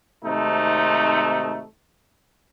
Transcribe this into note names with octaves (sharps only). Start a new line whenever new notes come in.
G#1 C3 A3 D#4